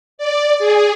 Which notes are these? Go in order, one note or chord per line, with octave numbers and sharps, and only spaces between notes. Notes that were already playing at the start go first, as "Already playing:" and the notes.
D5
G#4